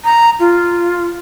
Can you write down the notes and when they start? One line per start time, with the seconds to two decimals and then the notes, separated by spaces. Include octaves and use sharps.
0.05 A#5
0.40 F4